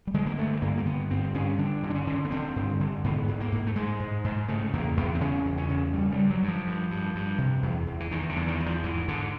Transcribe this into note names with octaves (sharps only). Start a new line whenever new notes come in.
G3
D3 G#3
A#3
G2 A3
G2 A#3
A#3
D3 B3
G2 C4
G2 C#4
D3 D4
D3
D4
C#4
D3
B3
D3 C4
G2
D3
G#2 B3
G#2
A#3
G#2
A3
G#2 G#3
G#2
G#2
C#3 A3
E2 A#3
E2 B3
C4
C#3 C#4
E2
C#4
C#3
G2 G3
G3
G2
F#3
G2
F3
G2
G2
G2
C3
E2
E2
E3
E2 D#3
D3
E2
D#3
E2
F3
G#2 E3
G#2 D3